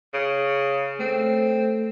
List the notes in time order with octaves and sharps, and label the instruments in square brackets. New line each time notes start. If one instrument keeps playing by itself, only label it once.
[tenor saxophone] C#3
[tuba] A3 [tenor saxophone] C4